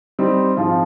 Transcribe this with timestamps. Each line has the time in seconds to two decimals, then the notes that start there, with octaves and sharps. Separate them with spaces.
0.19 G3 C4 D#4
0.57 G#2 F3 C4 F4